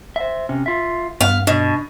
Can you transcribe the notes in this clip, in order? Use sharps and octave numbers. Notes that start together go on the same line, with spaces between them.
C5 E5
C3 C#4
F4 E5
G2 B3 F5
B2 D4